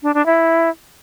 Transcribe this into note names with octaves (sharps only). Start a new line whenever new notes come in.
D4
D4
E4